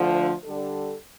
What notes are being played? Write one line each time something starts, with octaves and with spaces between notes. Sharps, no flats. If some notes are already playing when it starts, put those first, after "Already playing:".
Already playing: D2 D3 F3
D3 G3 D4 A4